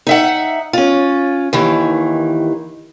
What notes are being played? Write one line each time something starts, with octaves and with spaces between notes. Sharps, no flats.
D#4 E5 F#5
C#4 F4
D#2 D#3 E3